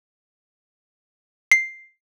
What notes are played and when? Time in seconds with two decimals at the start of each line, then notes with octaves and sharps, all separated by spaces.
1.51 C7